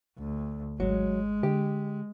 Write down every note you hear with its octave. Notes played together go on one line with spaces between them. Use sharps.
D2
G#1 F#3 G#3
D3 G4